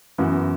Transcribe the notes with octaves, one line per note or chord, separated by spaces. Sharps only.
F#2 E3 B3 F#4